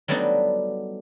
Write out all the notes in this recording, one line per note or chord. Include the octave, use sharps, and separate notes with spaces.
F#3 G3 A3 B3 D4 D#4